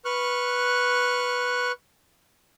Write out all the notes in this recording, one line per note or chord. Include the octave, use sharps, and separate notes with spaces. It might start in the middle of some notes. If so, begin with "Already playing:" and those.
B4 C#6 F6 F#6